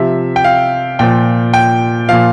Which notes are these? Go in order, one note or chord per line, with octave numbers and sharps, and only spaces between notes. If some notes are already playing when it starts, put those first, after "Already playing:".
Already playing: C3 F3 E5
G5
F5
A#2 F3 G5
G5
A#2 F3 F5